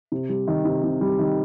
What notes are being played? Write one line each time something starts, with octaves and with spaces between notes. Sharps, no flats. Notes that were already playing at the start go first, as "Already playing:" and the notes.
C3
G3
D#3
C3
C3
G3
D#3